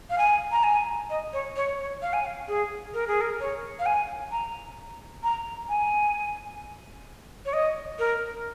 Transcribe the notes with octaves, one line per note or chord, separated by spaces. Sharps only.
F5
G#5
A#5
G#5
D#5
C#5
C#5
C#5
F5
G#5
F5
G#4
A#4
G#4
A#4
C#5
F5
G#5
A#5
A#5
G#5
C#5
D#5
A#4